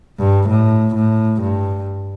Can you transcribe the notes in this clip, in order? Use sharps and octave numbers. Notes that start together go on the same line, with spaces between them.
G2
A2
A2
G2